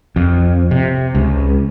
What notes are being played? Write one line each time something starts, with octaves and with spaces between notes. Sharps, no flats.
F2
C3
C#2